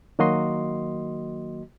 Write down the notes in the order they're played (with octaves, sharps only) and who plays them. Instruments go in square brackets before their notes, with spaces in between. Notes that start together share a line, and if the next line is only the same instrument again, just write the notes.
[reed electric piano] D#3 F#3 A#3 F#4 D#5 C6